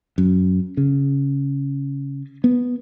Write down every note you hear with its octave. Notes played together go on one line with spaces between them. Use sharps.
F#2
C#3
B3